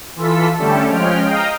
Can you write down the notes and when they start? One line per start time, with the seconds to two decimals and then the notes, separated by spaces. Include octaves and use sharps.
0.16 E3 F4 A4 B6
0.58 D3 G3 A3 C#4 G4 A4
0.89 F3 G#3 C#4 G5 F6
1.23 D#5 F5 G5 A#5 D#6